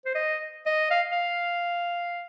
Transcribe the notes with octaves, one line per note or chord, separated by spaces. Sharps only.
C5
D#5
D#5
F5
F5